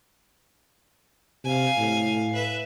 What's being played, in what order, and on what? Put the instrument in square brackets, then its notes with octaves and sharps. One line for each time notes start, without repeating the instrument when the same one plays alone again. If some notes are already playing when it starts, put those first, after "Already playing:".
[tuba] C3 [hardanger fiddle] F5 G#5
[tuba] A2
[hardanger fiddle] B4 E5